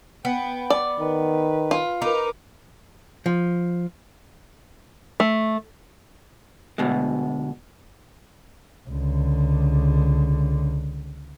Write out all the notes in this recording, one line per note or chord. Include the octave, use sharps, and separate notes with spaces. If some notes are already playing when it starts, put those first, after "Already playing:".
B3 G5
D5
D#3 B4
F4
D#4 A#4 B4 D6
F3
A3
D2 B2 G#3
C#2 D3